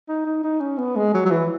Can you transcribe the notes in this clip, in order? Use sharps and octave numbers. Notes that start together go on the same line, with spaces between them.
D#4
D#4
D#4
C#4
B3
G#3
F#3
F#3
E3